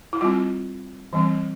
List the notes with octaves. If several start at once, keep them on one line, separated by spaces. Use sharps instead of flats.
E4
G3 C4 F4
E3 G3 C4